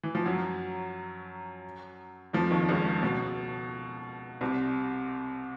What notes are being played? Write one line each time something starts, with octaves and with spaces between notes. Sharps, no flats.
E3
F3
F#2 F#3
F2 F3
D#2 D#3
C#2 C#3
B2
C2 C3